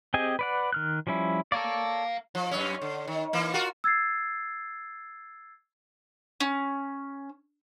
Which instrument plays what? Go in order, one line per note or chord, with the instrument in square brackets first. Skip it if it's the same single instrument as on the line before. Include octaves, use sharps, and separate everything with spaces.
[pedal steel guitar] C4 G4 G#4 D#5 G#5
B4 D5 F#5
D#3 F6 F#6
F3 G3 C#4 E4
[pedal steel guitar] A4 C#5 D5 [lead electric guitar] F5 A#5
[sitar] F3
F#2 C#4
D3
D#3
E3 A#3
F4 F#4 A#4
[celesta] E6 G#6 A6 C7
[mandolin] C#4